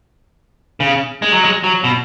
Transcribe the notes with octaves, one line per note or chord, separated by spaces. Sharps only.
C#3
G#3
F#3
G#3
F#3
B2